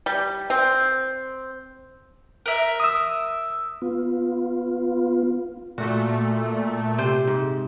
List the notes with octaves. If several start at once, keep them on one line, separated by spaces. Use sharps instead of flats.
G3
C4
A#4 E5
D#6 E6
B3 F4
A#2 A3 F#4
C3 C5
G#2